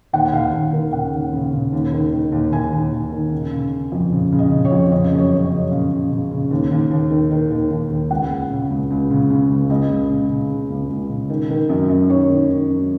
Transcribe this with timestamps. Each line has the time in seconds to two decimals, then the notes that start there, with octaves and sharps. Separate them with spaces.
0.13 D#2 F#5
0.33 D#2 F5
0.53 D#2
0.73 D#2 A#4
0.93 C#3 F#5
1.13 D#2
1.33 C#3
1.53 C#3
1.73 D#2
1.93 D#3
2.13 D#3
2.32 D#2
2.52 D#2 G#5
2.73 D#2
2.93 D#2
3.12 D#3
3.32 C#3
3.52 C#3
3.72 C#3
3.92 F2
4.12 C#3
4.32 C#3
4.39 D#5
4.52 C#3
4.65 C#5
4.72 F2
4.92 C#3 D#5
5.12 F#2
5.18 C#5
5.32 C#3 C#5
5.44 D#5
5.52 F#2
5.71 C#3 F5
5.91 C#3
6.11 C#3
6.31 C#3
6.51 D#2
6.71 D#2
6.91 D#2
7.11 D#3
7.31 D#3
7.51 D#2
7.71 D#2
7.90 D#2
8.10 C#2 F#5
8.30 C#2
8.51 C#3
8.70 C#2
8.91 C#2
9.10 C#3
9.30 C#3
9.50 C#2
9.70 C#2 D#5
9.89 C#2
10.10 C#3
10.29 C#3
10.50 C#3
10.70 C#2
10.89 C#2
11.09 C#3
11.30 D#3
11.50 D#3
11.69 F#2
11.89 F#2
12.09 D#3 C#5
12.29 D#3
12.49 D#3
12.69 F#2